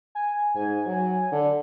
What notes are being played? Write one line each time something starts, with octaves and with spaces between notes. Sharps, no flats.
G#5
G#2 G#5
F#3
D3